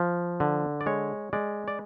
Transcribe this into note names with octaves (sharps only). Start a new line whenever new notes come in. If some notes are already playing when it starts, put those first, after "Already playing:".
Already playing: F3
D3
D5
G#3 C#5
G#3 D5
D5